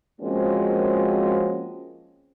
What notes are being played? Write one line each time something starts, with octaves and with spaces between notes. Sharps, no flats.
F3 G#3 A#3 C4 C#4 F#4